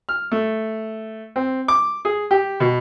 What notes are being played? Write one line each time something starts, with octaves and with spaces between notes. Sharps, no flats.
F6
A3
C4
D6
G#4
G4
B2